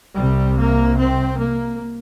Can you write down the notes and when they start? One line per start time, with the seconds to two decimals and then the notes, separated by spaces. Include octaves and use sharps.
0.15 C2 C3 G3
0.57 A#3
0.97 C4
1.39 A#3